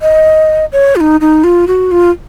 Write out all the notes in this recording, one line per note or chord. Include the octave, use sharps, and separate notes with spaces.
D#5
C#5
F4
D#4
D#4
F4
F#4
F4